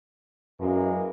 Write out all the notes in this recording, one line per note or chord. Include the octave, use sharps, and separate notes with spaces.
F#2 E3 G#3 A#3